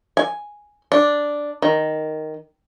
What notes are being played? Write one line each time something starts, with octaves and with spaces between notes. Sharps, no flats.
G#5
D4
D#3